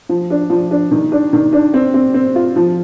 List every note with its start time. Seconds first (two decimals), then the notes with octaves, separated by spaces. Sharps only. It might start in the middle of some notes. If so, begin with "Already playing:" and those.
0.09 F3
0.30 D4
0.50 F3
0.71 D4
0.91 D#3
1.12 D4
1.33 D#3
1.53 D4
1.74 C4
1.94 C4
2.14 C4
2.35 F4
2.56 F3